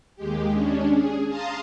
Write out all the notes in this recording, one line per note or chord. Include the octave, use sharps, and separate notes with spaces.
D#2 G#3 G4
C#4 D4
G#4
F5 A5 A#5 C6 D#6